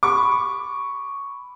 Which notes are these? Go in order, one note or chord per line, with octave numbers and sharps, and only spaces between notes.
B5 C#6 D6